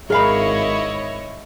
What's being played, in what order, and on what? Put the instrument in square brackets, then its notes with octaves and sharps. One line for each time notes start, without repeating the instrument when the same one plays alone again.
[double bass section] G#1 [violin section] E4 C#5 D#5 [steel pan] G#4 [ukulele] A#4 F5 B5